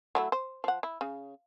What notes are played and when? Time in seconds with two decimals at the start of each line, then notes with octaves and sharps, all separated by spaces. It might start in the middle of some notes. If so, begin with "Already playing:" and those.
0.15 F#3 A3 E4
0.32 C5
0.64 F3 F#5
0.83 E4
1.01 C#3